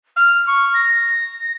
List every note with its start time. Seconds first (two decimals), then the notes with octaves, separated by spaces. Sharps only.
0.16 F6
0.47 C#6
0.74 A#6